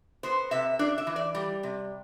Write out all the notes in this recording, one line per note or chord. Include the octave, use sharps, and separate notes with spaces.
B3 C5
C3 E5
D4 D5
E5
E3
D5
G3
C3